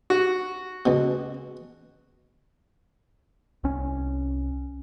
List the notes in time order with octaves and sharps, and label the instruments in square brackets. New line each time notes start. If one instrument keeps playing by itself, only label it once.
[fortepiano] F#4
[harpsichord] C#2 B2
[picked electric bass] C2 C#4